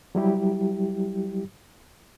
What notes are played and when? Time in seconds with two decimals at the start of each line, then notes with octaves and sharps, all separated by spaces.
0.15 F#3 G3 E4 G4